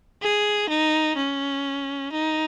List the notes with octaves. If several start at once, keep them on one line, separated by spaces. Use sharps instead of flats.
G#4
D#4
C#4
D#4